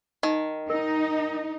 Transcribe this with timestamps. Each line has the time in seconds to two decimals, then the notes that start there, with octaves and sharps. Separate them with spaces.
0.23 D#3 D#4
0.70 D#4 A#4